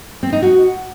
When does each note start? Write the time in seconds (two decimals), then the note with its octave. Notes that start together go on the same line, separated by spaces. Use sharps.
0.23 C4
0.33 D#4
0.42 F#4